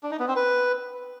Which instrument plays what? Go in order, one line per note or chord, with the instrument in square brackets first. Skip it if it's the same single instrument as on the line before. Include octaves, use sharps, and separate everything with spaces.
[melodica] D4
D#4
B3
C4
B4